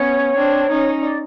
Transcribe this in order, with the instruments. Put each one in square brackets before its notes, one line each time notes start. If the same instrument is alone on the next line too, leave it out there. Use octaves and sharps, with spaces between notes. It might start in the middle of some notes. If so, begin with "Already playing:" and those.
Already playing: [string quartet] B3 C#4 [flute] C#5
[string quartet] C4 D4
C#4 D#4
[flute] D5